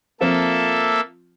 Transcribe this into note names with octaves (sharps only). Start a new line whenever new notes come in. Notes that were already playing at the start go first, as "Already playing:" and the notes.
F3 A#3 C4 F4 A4 E5